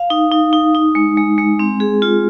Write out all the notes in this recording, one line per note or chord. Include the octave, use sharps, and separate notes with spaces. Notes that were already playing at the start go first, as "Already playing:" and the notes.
Already playing: F5
D#4
D#4
D#4
D#4
G#3
G#3
G#3
C4
G#4
F4